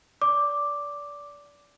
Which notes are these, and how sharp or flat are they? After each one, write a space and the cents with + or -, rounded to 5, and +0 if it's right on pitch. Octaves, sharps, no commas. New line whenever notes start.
D5 -25 D6 +0